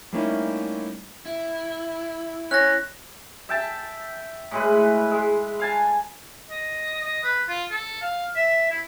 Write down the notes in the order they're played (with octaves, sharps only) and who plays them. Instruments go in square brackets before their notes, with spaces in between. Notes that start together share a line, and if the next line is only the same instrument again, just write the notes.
[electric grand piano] G3 A3 A#3 C#4 D#4 E4
[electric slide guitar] E4
[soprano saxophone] C#4 [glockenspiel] F#6 A#6
[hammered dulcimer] E5 G5 A5
A2 G#3 B4
G#3
F5 G#5 A5
[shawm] D#5
D#5
B4
F4
A4
F5
E5
E4